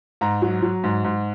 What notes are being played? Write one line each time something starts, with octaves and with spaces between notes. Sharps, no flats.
G#2 A#5
F#3
F#3
G#2
G#2